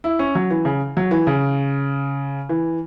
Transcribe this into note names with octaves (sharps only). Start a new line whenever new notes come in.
E4
C#4
F#3
E3
C#3
F#3
E3
C#3
E3